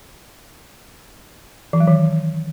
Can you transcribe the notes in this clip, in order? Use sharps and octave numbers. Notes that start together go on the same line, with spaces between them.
E3
F#3
D#3